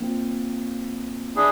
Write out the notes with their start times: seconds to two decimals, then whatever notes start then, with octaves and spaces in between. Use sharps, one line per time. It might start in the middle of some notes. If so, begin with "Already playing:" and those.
0.01 A#3 C4 F4
1.36 D4 E4 G#4